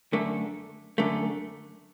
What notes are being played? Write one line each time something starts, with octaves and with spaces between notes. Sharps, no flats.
F#2 D3 A3
F#2 D3 A3